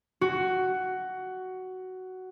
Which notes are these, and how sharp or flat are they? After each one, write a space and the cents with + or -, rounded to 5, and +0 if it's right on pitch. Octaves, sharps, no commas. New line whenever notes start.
F#4 +10